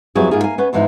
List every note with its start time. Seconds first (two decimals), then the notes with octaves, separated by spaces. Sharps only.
0.15 F2 F#3 G3 B3 E4 G#4
0.31 G#2 A#3 F4 G#4
0.44 A#3 G#5
0.58 B3 C#4 B4
0.73 E2 G#2 E3 F3 D#4